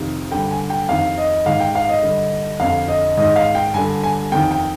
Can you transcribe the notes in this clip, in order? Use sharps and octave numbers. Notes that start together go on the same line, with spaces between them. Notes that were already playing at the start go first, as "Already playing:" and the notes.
Already playing: F2 C3 D#3
G2 D3 G5
G#5
G5
F2 D#3 F5
D#5
G#2 D#3 F5
G5
F5
D#5
G2 D3
F2 D3 F5
D#5
G#2 D#3 D#5
F5
G5
G2 D3 G#5
G#5
F2 D#3 G5
G5